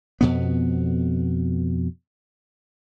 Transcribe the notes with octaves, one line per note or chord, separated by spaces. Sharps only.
F2 B2 B3